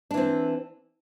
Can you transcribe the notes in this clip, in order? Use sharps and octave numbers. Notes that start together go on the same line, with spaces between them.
E3 C4 D4